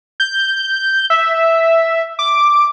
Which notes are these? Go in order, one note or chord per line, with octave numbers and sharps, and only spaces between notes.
G6
E5
D6